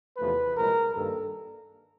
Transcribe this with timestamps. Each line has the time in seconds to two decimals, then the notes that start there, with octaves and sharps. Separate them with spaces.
0.17 E2 C3 F3 A3 B4
0.57 C2 A#2 F3 G#3 A#4
0.95 G2 D#3 G3 A#3 A4